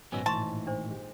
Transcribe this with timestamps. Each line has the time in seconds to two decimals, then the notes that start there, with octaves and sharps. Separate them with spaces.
0.12 G#1 A#2 F#3 B3 C#4 G#5 E6 A#6
0.26 A2 E3 A5 C6 C#6
0.67 D4 C5
0.88 G#3 G4